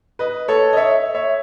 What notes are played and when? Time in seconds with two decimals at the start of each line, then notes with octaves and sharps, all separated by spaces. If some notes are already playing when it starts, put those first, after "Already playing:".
0.19 B4 D#5
0.48 A4 C#5
0.73 D#5
0.77 C#5 E5
1.14 C#5 E5